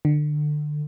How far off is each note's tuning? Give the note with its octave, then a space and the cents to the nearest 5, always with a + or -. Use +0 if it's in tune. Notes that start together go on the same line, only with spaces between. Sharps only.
D3 +25